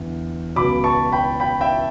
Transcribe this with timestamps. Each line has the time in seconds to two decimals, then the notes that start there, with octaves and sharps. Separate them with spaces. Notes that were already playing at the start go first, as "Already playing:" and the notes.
Already playing: E2 D3
0.56 C#2 B2 F#3 B5 D6
0.84 A5 C#6
1.12 G5 B5
1.40 G5 B5
1.61 E5 G5